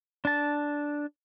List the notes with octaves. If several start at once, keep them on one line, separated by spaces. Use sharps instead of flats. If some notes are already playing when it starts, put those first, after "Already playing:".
D4 A5